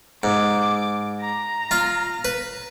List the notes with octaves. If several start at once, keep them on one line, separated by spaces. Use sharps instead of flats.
G#2 D6
A#5
F4 F5
B4